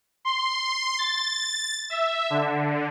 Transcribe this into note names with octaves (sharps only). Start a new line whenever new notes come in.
C6
A6
E5
D3